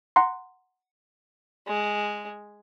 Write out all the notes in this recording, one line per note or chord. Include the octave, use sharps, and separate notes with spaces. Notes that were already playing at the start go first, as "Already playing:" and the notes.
F#5 A#5 C6
G#3